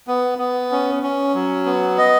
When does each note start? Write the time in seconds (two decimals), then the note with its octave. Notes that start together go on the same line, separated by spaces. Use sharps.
0.07 B3
0.38 B3
0.71 C#4
1.03 C#4
1.34 F#3
1.66 B3
1.98 D#5